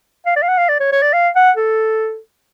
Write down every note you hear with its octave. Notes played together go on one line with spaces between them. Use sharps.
F5
D5
F5
F#5
F5
D5
C#5
C#5
D5
F5
F#5
A4